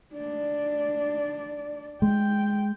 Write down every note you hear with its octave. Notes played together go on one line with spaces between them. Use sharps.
D4 D5
G#3 G5